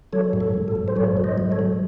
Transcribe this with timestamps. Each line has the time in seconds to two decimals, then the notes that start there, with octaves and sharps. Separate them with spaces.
0.13 F#3 A4 C#5
0.33 G#2
0.40 A4
0.54 G#2
0.68 A4
0.75 G#2
0.88 C5
0.96 F#3 A4 C#5
1.17 G#2
1.24 C5 D#5
1.38 F#3
1.51 A4 C#5
1.59 F#3